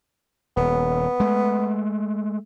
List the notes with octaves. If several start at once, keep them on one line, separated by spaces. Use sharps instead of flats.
D#1 B3
G#3 A3